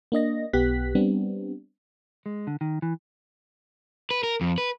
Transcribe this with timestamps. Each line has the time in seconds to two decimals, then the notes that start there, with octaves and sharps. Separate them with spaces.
0.12 A#3 D4 D#5 A#6
0.53 B1 B3 G4 F#6 B6
0.95 G3 B3 C4 D4
2.26 G#3
2.47 D3
2.61 D#3
2.82 E3
4.11 B4
4.23 A#4
4.41 F2
4.58 B4